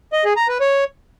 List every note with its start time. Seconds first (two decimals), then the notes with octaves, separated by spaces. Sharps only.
0.13 D#5
0.25 G#4
0.37 A#5
0.48 B4
0.60 C#5